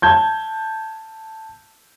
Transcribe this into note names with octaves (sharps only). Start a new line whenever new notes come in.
A5 G6 G#6